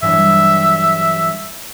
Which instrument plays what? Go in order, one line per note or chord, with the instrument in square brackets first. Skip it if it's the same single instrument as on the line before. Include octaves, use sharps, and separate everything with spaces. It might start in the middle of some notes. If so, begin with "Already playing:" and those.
[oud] G2 E3 F#3 [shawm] E5